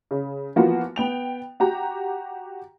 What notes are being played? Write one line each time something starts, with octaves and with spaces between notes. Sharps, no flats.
C#3
E3 F3 A#3 B3 F4 F#4
B3 G5 F7
F#4 G4 A#5